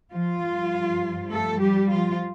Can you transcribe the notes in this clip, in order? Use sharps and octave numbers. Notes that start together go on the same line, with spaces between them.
F3 F4
G2 F3
A3 A4
G3 G4
F3 F4